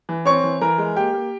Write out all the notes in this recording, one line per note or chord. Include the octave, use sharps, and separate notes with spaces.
E3
C4 C#5 C#6
E3
E3 A#4 A#5
G#3
A#3 G4 G5
A#3